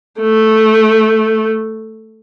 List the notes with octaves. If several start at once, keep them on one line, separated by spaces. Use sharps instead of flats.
A3